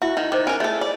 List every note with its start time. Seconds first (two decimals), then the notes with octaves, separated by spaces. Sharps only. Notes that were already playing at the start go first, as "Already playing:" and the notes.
0.02 E4 F#4 E5 B5
0.17 D#3
0.32 D#3 C5 D#5 D6
0.47 C#4 A#4 G#5
0.60 A3 G#4 A4 D#5
0.81 D5